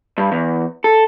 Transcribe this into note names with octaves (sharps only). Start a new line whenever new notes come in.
G2
E2
A4